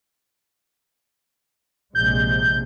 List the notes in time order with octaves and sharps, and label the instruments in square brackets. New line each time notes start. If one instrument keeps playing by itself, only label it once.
[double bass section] A#1 C3 G#3 [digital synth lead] G6